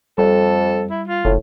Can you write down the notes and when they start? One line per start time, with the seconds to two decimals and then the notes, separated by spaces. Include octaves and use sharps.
0.18 F2 G3 A4
0.91 E4
1.08 F4
1.25 F#1 A2